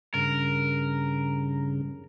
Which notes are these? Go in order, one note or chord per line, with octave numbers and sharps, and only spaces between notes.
G2 C#3 A#4